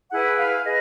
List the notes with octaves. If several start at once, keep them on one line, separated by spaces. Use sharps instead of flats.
E4 G#4 B4 F#5
F5
G#4 B4 D#5